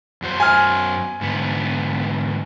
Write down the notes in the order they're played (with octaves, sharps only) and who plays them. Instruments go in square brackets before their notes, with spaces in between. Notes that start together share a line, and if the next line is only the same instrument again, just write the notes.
[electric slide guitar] F#2 F#4 C5
[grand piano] G#5 F6
[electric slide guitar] G#2 D3 B3